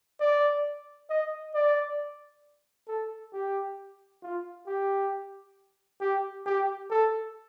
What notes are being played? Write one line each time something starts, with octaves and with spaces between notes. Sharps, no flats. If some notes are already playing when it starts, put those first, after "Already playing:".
D5
D#5
D5
A4
G4
F4
G4
G4
G4
A4